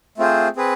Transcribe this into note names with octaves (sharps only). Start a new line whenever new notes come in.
A3 C4 F4 G#4 C5
C4 G#4 B4